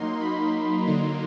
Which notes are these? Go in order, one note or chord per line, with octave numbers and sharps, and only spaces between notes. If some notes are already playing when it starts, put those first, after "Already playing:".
Already playing: F#3 A#3 D#4 C6
B5
D3 F#3 A#3 D#4 C6